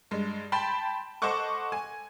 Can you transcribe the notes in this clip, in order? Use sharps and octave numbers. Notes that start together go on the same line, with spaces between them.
G2 G#3
G5 A5 B5 C6
A4 C5 D#5 F#5 C#6 D6
G#5